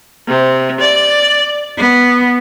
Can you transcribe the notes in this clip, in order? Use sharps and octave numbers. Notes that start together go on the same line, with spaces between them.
C3
D5
B3